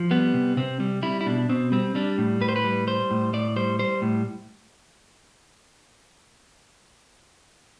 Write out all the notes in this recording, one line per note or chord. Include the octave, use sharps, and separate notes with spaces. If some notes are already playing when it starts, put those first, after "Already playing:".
Already playing: F3
G3 B3
C3
C3 C4
G3
G3 E4
E4
B2 D4
B2 C4
G3 C4
G3 D4
A2
A2 B4
C5
B4
G3
G3 C5
A2
A2 D5
G3 C5
G3 C5
A2